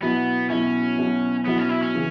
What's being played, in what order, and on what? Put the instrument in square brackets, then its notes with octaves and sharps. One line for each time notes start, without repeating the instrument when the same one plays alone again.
[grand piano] B2 F#3 E4 [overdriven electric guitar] B3
[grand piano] B2 F#3 E4 [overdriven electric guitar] C#4
[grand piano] B2 F#3 E4
[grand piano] B2 F#3 E4 [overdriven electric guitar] B3
[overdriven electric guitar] C#4
E4
C#4
[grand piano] C#3 E3